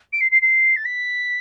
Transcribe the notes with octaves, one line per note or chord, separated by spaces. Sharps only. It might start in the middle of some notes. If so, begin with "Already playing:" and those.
D7
C7
C7
C7
A6
B6